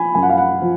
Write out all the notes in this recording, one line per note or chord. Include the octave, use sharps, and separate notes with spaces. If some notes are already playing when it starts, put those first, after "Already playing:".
Already playing: F3 G#5 B5
F#2 G#5
F#5
F5
F#5
F3